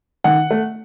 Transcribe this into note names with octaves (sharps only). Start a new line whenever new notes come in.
D#3 F#5
A3